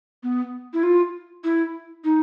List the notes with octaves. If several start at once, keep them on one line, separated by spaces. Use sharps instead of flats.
B3
E4
F4
E4
D#4